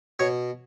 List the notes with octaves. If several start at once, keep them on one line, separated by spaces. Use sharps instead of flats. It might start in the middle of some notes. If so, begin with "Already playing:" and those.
B2 C#5